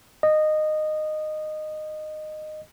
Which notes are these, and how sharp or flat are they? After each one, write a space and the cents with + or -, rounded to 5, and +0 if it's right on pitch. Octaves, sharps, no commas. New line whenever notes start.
D#5 -15